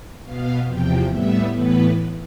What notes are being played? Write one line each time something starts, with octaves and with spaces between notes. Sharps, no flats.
B2 B3 F5
E2 C3 F3 G5
A2 G3 B3 E5
A2 E3 B3 B4